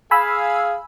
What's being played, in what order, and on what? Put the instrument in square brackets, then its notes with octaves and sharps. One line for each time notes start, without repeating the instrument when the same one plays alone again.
[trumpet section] G#4 F5 [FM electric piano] G#5 B5 E6